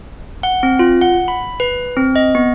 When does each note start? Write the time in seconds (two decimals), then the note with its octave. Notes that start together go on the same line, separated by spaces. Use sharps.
0.43 F#5
0.63 C4
0.79 F4
1.01 F#5
1.28 B5
1.60 B4
1.97 C4
2.16 D#5
2.35 B3